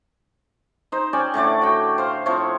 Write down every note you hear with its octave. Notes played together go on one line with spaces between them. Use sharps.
D#4 C5
C#4 D5 G5 G#5
A2 D3 A3 D5
F#4 G5
C5 F5
F3 C4 E4 C#5